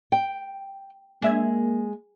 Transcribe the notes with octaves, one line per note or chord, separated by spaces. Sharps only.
G5
G#3 A#3 D4 E5 G#6